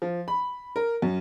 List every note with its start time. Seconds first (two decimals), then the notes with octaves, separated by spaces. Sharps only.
0.02 F3
0.28 B5
0.76 A#4
1.02 F#2